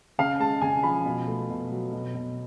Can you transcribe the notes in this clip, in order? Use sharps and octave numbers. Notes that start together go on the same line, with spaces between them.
C#3 F5
G#3 A5
C#3 G#5
F3 B5
B2
A3
B2
F#3
B2
B2